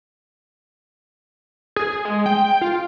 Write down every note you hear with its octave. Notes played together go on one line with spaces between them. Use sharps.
G#4
G#3
G5
F4